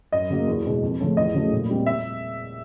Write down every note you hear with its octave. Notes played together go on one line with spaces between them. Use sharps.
F#2 D#5
C#3 F#3 A#3
E2
B2 G#3
F2
C#3 F3 A3 C#4
E2 D#5
C#3 F#3 A3
A#2
G3 C4
E5